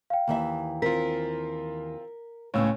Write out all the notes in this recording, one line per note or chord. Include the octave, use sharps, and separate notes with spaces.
F5 G5
D#2 E3 E5
C4 F4 A#4 B6
C#2 A2 C#4 C#5 F5 E6